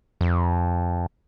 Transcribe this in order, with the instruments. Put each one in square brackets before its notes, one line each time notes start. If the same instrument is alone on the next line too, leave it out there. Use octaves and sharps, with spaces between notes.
[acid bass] F2